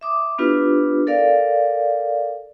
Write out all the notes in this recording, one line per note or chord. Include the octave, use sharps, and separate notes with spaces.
E5 D6 D#6
B3 D4 E4 F4 G4 B4
A4 A#4 D5 F5